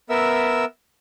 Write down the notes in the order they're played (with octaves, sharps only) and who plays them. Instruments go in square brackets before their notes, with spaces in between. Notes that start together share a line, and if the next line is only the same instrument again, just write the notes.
[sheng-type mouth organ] B3 A#4 E5 E6